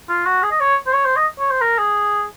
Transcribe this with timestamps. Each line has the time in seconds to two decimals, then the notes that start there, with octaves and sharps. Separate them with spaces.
0.09 F4
0.26 F#4
0.43 G#4
0.51 D#5
0.60 C#5
0.87 C5
0.93 C#5
1.05 C5
1.16 D#5
1.39 C#5
1.50 C5
1.61 A#4
1.78 G#4